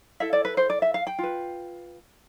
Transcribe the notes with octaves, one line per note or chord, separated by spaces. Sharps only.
E4 A4 E5
D5
B4
C5
D5
E5
F5
G5
F4 B4